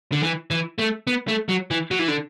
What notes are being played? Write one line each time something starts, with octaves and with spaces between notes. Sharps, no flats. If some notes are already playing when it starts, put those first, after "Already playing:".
D3
E3
E3
A3
B3
A3
F#3
E3
F#3
E3
D3